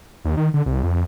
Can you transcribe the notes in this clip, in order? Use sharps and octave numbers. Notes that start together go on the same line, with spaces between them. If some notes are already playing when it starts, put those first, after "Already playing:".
D#2
D#3
D3
C2
F2